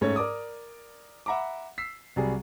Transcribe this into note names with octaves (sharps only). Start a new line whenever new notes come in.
G#2 A3 C#4 C#5
A#4 D5 D6 D#6
E5 F#5 A#5 B5 D6
E6 B6 C7
C2 F#3 G3 G#4